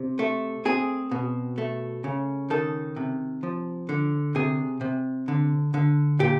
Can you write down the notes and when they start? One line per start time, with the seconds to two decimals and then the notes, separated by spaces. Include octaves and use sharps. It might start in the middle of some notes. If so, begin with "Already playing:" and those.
Already playing: C3
0.19 A3
0.65 C4 G#4
1.11 B2
1.58 A3
2.04 C#3
2.50 D#3 A4
2.96 C3
3.43 F3
3.89 D3
4.35 C3 G#4
4.81 C3
5.28 D3
5.74 D3
6.19 A#2 G4